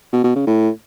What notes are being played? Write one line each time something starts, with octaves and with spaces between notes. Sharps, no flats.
B2
B2
C#3
A2